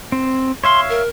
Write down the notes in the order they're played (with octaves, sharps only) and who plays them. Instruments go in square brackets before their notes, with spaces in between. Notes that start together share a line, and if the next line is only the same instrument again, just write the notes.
[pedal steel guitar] C4
[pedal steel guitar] C#5 E5 F5 [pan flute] C6
[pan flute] A#4